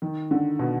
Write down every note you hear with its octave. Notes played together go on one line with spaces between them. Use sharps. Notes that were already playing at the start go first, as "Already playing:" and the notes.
D#3
D3
B2